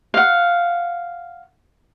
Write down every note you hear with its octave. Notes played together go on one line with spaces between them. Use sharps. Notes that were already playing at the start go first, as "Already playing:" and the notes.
F5 F#5